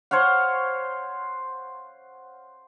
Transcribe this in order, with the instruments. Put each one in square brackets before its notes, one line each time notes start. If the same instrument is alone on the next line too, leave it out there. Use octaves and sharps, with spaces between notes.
[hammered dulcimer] C5 C#5 F5 F#5